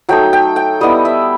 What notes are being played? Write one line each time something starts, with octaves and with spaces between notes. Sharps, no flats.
F#3 A3 D#4 G5
G5
G5
G3 B3 E4 D#5
E5